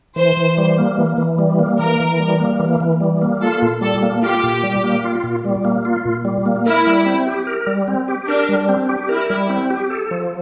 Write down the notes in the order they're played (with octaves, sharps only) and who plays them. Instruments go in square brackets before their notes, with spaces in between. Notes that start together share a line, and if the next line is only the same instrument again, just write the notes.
[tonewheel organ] E3 [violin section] C5
[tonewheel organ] E3
G3
A#3
E3
E3
G3
A#3
[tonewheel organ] E3 [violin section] A#4
[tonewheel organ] E3
G3
A#3
E3
E3
G3
A#3
[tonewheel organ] F4 [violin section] A4
[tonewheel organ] A#2
[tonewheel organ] G3 [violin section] A4
[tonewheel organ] A#3
[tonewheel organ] F4 [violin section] G4
[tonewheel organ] A#2
G3
A#3
F4
A#2
G3
A#3
F4
A#2
G3
A#3
[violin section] E4 [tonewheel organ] A#4
[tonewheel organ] G3
C4
G4
A#4
G3
C4
G4
[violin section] D4 [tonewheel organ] A#4
[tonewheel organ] G3
C4
G4
[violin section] E4 [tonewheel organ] A#4
[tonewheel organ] G3
C4
G4
A4
F3